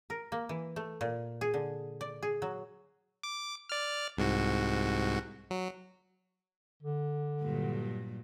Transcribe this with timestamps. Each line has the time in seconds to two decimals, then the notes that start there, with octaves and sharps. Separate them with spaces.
0.10 A#4
0.32 A#3
0.49 E3
0.76 A3
1.01 A#2
1.41 G#4
1.54 D3
2.01 D5
2.23 G#4
2.42 F#3
3.23 D6
3.69 D5 F6
4.17 C2 G#2 F#4
5.50 F#3
6.83 D3
7.41 G2 A#2 F#3